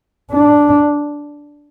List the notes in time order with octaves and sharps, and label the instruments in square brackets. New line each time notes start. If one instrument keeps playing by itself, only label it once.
[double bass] D4